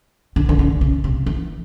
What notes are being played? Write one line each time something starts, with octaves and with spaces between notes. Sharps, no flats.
D3
D3
C#3
C#3
C3
E3